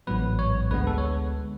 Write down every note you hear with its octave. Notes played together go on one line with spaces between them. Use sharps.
A1 G#2 F#3 B3 B4
C#5
D2 D3 G#3 B3 B4
A4
C#5